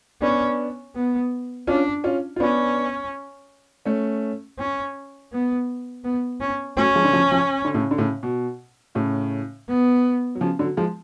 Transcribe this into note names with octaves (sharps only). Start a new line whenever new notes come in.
B3 C#4 D4
B3
C#4 D4 F4
C#4 F4
F4
B3 C#4 D4
A3 C#4
C#4
B3
B3
C#4
F#3 A3 C#4
F3 G#3
D3
C#3 F3
C#3 F3
D3
A2 C#3
D3
A2 C#3
B2
A2 C#3
B3
F#3
C#3 F3
D3 F#3
F3 G#3